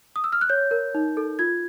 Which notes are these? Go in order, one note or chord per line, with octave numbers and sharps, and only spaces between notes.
D#6
E6
F6
F#6
C#5 G6
A#4
D#4
A4
F4 G#6